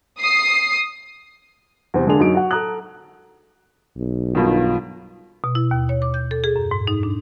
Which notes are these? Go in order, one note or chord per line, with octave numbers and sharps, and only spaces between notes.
D#6 C7
E2 C3 C4
D3 G#3 A#3 D4 G#4 F7
F#2 F#3 D#4 D7
F#4 F#5
A4 A#5 D#6 F#6
B1
G2 B2 D#3 F4
B2
E4
D#2
C#5
D6
G6
A4
G#4
F#2
G#2
D#4
D4